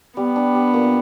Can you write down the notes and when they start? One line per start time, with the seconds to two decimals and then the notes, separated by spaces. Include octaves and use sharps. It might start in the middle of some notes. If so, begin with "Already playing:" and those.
0.16 G3 B3
0.36 D4
0.55 G3
0.74 A#2